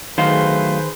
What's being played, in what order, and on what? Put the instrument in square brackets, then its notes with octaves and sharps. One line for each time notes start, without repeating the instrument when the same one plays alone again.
[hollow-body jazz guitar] D#3 [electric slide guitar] F#3 A3 F5 [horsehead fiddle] G#4 B4 [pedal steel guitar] C5